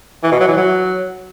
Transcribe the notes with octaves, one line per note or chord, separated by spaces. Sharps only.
E3
B2
F#3
E3
F#3